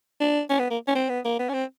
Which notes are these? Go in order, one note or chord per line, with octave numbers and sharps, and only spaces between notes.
D4
C#4
B3
A#3
C#4
C4
B3
A#3
B3
C#4
C4